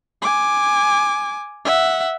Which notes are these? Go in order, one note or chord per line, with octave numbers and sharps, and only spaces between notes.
G#5 D6
E5 F#5